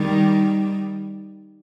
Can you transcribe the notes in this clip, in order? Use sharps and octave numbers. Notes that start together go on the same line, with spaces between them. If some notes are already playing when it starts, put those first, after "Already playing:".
Already playing: D#3 G3